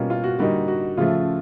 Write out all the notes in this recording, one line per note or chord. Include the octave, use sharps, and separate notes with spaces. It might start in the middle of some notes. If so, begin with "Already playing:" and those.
Already playing: B2 G3 A#3 C#4 F4
F4
F#4
D3 G3 A#3 D#4 F#4
F#4
C#3 F3 A3 F4